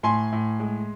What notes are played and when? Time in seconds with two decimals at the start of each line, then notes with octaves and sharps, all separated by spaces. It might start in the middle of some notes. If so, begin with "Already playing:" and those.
0.03 A2 G#5 C6
0.33 A2
0.60 G#3